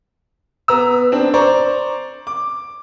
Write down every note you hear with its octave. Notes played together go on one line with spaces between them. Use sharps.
B3 A#5 E6
C4 D4
C5 D5 A#5 C#6
D6